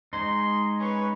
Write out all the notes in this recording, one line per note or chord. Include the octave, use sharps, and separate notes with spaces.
G#3 D#4 C6
C#4 B4 C#5